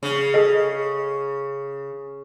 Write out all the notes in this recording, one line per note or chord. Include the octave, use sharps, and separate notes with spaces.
C#3
G#4 A4 D#5